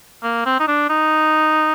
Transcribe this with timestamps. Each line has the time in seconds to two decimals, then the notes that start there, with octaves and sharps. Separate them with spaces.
0.23 A#3
0.46 C4
0.60 D#4
0.68 D4
0.90 D#4